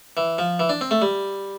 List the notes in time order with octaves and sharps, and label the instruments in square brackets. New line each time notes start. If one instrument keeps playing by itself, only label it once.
[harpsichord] E3
F3
E3
D4
C4
A3
G3